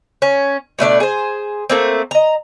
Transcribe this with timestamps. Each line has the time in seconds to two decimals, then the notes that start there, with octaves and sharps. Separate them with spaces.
0.22 C#4
0.79 B2 A3 D4 D5
1.00 G#4 C5
1.70 A3 A#3 C4
2.11 D#5 A#5